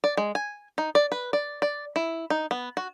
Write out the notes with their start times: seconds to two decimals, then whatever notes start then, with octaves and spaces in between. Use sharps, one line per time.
0.04 D5
0.17 G#3
0.35 G#5
0.78 D#4
0.95 D5
1.12 B4
1.33 D5
1.62 D5
1.96 E4
2.30 D#4
2.51 B3
2.77 F#4